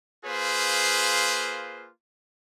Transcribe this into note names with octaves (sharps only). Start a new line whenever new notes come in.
A#3 F4 G#4 B4 C5